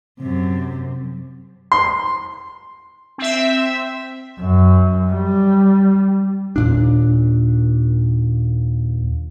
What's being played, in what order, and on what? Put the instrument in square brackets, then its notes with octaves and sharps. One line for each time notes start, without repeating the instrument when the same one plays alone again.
[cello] F#2 C3
[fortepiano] C6
[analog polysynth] C4 E5
[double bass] F#2
G3
[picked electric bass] D#2 A#2 D4